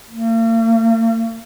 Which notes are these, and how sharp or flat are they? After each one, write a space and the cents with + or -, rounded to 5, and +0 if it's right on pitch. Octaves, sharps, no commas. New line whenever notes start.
A#3 -45